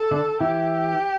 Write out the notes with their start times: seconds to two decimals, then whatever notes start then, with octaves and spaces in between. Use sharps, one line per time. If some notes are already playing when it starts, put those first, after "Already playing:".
Already playing: A4
0.11 D3 D4
0.41 E3 E4 G4